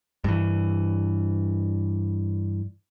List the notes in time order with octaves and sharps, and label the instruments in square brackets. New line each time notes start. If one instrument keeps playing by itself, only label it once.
[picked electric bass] G2 E3